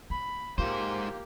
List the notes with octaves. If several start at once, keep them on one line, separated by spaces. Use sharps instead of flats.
A#3 B5
G#2 A#3 F4 G4 C5